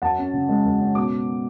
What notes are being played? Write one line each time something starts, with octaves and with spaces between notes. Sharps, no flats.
F#2 F#5 A5
C#4
C#3
G#3
F#2
C#4
B2 D6